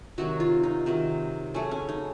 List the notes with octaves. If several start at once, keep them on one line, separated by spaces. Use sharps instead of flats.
C3 D#3 F#3 F#4
F4
D#4
C3 D#3 F#3
C#3 F#3 A3 C#4
C#4
D#4